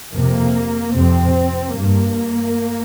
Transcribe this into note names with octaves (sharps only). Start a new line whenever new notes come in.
F2 C3 A#3
F2 C3 C4
G2 A#3